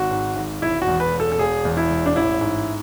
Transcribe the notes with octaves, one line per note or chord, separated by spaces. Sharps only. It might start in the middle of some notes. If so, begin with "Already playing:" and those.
Already playing: G#1 F#4
G#2
G#1
E1 E4
F#4
E2
B4
E1
A4
A4
E1 G#4
E2
E4
E1
D4
A1 E4
G#2